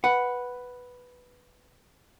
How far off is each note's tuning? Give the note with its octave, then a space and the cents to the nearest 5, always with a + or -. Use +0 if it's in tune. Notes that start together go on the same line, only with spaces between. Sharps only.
B4 +0 F#5 +0